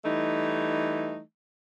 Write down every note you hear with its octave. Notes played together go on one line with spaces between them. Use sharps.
E3 G3 A3 D#4